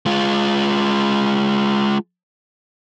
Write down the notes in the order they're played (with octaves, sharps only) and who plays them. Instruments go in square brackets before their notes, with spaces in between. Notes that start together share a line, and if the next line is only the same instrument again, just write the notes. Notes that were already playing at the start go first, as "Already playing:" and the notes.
[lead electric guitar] G#3 F4